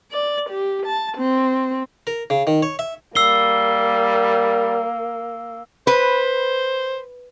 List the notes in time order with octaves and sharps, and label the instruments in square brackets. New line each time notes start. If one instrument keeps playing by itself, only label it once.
[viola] D5
G4
A5
C4
[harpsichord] A#4
C#3
D#3
C#5
E5
[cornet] G3 [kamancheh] A#3 [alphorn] A#4 [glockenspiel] E6 C7 G7
[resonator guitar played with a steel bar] B4 [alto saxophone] C5